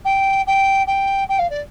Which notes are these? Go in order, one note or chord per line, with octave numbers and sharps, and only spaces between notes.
G5
G5
G5
G5
F5
D5